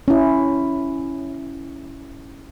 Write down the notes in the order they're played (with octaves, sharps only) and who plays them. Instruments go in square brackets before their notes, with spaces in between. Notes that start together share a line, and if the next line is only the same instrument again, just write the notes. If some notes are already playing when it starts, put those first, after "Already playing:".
[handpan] C#4 E4